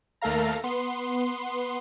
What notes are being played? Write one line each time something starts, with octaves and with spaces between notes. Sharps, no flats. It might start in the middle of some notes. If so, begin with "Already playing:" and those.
D#2 A3 A4 A#4 F5 A#5
B3 C6